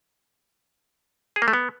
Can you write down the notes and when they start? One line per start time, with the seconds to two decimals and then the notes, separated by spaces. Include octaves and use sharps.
1.36 G#4
1.42 A#3
1.48 A3
1.53 B3